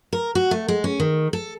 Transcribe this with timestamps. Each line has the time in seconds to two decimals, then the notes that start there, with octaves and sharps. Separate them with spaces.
0.13 A#4
0.35 F#4
0.51 A3
0.68 G#3
0.84 C#4
1.00 D#3
1.33 A4